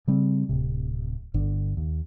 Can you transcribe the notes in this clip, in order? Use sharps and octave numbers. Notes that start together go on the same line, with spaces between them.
C#3 G3 C4
D1 C3
G1 D3
D#2